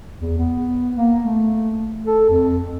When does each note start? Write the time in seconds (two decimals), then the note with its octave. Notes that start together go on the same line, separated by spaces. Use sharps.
0.20 E2
0.38 B3
0.96 A#3
1.24 A3
2.07 A4
2.29 F2